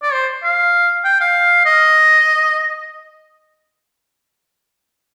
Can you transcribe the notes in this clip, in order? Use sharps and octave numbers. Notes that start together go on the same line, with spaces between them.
D5
C5
F5
G5
F5
D#5